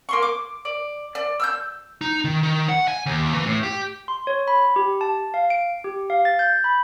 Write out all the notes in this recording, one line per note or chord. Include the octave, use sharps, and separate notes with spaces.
A#3 C6 C#6
D6
D5
D5
E6 F6 G6
D#4
D#3
D#3
F#5
G#5
D#2
E3
A2
G4
C6
C#5
B5
G4
A5
F5
D7
G4
F5
A6
G6
B5